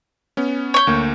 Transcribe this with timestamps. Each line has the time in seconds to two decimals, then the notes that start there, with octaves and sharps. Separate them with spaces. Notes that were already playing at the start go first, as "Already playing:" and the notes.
0.37 B3 C#4
0.74 C#5 G6
0.87 D2 A#3